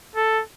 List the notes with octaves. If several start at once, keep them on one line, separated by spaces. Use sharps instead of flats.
A4